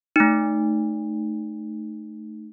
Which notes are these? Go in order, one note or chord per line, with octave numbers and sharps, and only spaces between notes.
A3 D#4